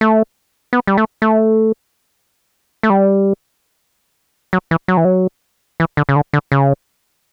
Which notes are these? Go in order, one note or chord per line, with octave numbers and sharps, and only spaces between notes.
A3
B3
G3
A3
A3
A3
G3
F#3
E3
F#3
E3
F#3
E3
D3
C#3
D3
D3
C#3